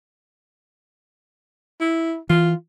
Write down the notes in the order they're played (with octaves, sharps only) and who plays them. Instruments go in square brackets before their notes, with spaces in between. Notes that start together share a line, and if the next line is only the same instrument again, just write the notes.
[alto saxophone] E4
[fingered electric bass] E3 [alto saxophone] F4